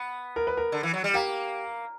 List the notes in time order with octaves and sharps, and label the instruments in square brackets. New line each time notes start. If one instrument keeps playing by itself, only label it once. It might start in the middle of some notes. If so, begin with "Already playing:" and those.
Already playing: [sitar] B3
[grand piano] A#4
B4
A#4
[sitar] D3
E3
F#3
G3
[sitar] A#3 [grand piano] G4